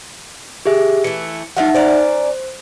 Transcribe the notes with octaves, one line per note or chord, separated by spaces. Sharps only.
G4 G#4 E5
E3 A3 C#7
F3 F#3 A3 D#4 E5 F#5
C#4 C5 D5 A#5